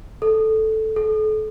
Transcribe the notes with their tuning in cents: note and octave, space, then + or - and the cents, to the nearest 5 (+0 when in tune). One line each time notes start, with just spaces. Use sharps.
A4 -5
A4 -35